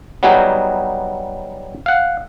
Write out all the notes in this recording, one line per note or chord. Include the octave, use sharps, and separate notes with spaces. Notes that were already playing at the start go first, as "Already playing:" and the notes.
F#3 G3 B3 D#4 F#4 G#4
F5 F#5